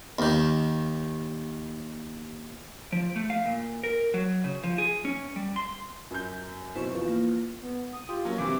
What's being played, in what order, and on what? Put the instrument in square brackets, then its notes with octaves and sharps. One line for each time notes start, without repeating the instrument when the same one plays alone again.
[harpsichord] D#2 D#3
[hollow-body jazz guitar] F3
A3
F5
A#2
A#4
F#3
C#3
F3
G#4
C#4
G3
C6
[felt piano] F#2 G6
[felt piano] B2 F#3 C4 [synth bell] E4 C#6
[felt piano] E2 F3 [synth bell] C#6
[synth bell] A#3
[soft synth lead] B3
D#6
[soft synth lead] F4 [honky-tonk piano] G4
[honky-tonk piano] F#3 C#4 [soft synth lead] A#3
[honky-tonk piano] G2 C3 E3 [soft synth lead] D6